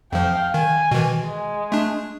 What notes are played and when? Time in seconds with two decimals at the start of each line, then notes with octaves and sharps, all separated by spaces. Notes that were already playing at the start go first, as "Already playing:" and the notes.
0.12 F2 F3 F5 G5
0.54 D#3 G#5
0.91 B2 D#3 E3
1.23 G#3
1.72 A3 D4